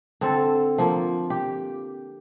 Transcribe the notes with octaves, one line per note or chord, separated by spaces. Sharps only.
D3 C4 A4
F3 A#3
G4